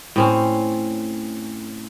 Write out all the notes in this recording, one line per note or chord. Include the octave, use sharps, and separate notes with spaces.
A2 C4 C#4